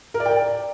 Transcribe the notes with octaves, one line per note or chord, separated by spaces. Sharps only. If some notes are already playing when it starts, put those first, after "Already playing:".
A#4
D5
G5
D5